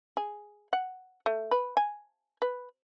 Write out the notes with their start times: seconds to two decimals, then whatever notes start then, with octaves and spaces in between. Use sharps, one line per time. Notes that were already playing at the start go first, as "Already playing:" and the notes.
0.17 G#4
0.73 F#5
1.26 A3
1.51 B4
1.77 G#5
2.42 B4